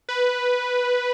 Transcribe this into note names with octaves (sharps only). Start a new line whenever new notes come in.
B4